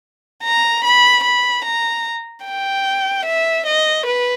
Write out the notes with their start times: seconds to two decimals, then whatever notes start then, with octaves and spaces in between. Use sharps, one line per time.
0.44 A#5
0.84 B5
1.24 B5
1.65 A#5
2.46 G5
3.26 E5
3.66 D#5
4.06 B4